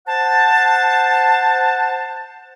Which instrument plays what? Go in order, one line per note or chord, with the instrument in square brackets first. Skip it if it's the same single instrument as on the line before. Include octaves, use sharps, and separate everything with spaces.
[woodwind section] C5 F#5 A5